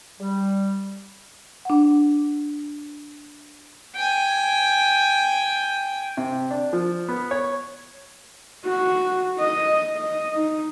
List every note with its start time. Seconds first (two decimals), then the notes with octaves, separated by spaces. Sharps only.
0.20 G3
1.65 D4 F#5
3.95 G5 G#5
6.17 C3
6.51 D4
6.73 F3
7.09 B3
7.31 C#5
8.65 F#4
9.39 D#5
9.95 D#5
10.35 D#4